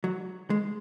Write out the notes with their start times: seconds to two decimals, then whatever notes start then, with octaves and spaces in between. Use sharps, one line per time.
0.04 F#3
0.50 G#3